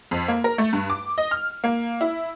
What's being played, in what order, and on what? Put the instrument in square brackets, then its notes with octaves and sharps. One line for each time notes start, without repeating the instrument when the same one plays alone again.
[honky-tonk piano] F2
A#3
A#4
A3
G2
D6
D#5
F6
A#3
E4